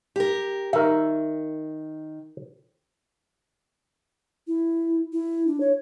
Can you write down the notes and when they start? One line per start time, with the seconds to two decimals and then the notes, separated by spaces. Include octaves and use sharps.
0.16 G4 A#4
0.73 D#3 A#4 E5
4.48 E4
5.13 E4
5.47 D4
5.60 C#5